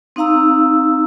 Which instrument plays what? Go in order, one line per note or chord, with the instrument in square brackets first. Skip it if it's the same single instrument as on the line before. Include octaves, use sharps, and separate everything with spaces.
[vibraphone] C4 D#4 F5 A#5 E6